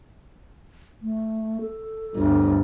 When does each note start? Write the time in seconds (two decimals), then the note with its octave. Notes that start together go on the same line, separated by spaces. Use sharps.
1.02 A3
1.61 A4
2.14 G1 D2